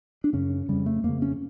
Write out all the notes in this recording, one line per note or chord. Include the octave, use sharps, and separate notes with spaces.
D4
F#2 C#3 C#4
F2 C#3 G3
A3
F2 C#3 A#3
C#4